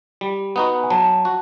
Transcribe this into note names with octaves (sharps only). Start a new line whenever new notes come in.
G3
B3 D#4 F#4
G#5
F#3 A5
F#4